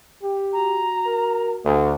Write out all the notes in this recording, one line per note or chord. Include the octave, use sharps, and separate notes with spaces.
G4
F#4 A#5
A#4
D2 A3